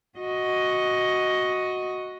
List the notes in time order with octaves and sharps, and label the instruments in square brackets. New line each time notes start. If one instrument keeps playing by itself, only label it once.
[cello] F#4 D#5